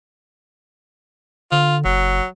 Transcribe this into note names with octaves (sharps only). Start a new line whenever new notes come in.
D3 F4
F#1 F#3